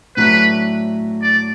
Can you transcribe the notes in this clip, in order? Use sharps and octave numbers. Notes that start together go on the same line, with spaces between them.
A2 F#3 A3 D4 B4
D5